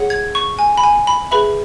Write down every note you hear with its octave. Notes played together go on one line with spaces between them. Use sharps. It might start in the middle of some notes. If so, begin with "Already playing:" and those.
Already playing: G#4 C#5 F#5
G#6
C#6
G#5
B5
G#5
B5
G#4 B4 E5 B5